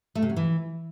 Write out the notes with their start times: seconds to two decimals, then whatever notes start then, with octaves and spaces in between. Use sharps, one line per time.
0.15 A3
0.22 C3
0.29 F#3
0.36 E3